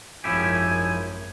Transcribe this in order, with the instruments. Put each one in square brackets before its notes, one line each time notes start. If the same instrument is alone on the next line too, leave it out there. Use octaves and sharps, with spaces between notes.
[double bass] G#1 F#2 [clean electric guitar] F3 E4 G4 [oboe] G#5